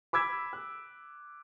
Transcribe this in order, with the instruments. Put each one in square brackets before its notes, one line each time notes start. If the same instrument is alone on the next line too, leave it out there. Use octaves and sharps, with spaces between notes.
[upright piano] B5 D6 E6 G#6 B6
F#6